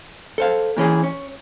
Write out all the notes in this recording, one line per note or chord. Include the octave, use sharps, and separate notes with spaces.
A4 C5 F5
A#2 E3 C#4 G#4
C#4